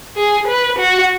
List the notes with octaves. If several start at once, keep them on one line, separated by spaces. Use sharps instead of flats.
G#4
B4
F#4